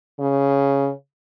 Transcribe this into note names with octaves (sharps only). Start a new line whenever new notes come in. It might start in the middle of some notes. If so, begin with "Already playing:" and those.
C#3